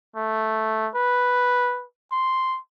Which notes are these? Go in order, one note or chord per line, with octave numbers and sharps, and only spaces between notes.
A3
B4
C6